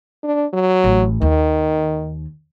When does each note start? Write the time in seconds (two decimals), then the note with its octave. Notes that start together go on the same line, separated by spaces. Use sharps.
0.24 D4
0.53 F#3
0.84 A1
1.21 D#2 D#3